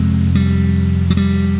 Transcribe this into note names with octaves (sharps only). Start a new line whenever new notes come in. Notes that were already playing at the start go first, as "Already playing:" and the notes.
Already playing: F2 C3 G#3
G3
F#3
G3